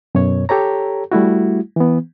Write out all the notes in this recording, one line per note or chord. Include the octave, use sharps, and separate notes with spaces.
F#2 B2 C#5
G4 A4 C#5 A#5
G3 A3 E4 F#4
E3 B3